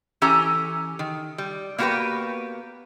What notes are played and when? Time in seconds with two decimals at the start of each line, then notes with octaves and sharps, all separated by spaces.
0.22 E3 C#4 G4 A4 G#5 A#5
0.99 D#3
1.38 G3
1.78 A#3 B3 F#4 G4 A#4 B4